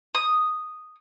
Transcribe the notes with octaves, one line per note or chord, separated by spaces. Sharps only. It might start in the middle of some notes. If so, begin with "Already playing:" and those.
D#6